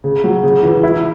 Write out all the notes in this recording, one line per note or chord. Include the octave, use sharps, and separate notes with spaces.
C#3
F#3
C#3
E3
E4